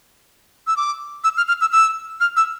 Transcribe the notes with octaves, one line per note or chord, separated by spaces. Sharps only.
E6
D6
E6
F6
F6
E6
E6
F6
E6